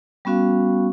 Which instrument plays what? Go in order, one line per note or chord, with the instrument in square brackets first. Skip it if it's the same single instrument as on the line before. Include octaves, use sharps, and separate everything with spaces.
[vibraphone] G3 B3 C#4 F#4 F5 C#6